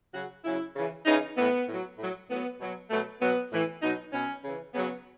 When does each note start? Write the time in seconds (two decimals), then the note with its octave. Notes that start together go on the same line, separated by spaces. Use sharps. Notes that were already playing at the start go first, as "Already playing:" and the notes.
0.14 C#3 F#3 F#4
0.45 C#3 F#3 E4
0.76 C#3 E3
1.06 C#3 E3 D#4
1.37 A2 E3 B3
1.68 A2 F#3
1.98 A2 F#3
2.29 A2 F#3 B3
2.60 B2 F#3
2.91 B2 F#3 A3
3.21 B2 F#3 B3
3.52 A2 E3
3.83 B2 F#3 D#4
4.13 B2 F#3 C#4
4.44 C#3 E3
4.74 C#3 F#3 B3